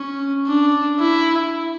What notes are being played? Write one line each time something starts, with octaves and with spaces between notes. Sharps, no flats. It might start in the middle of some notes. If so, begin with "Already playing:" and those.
Already playing: C#4
D4
E4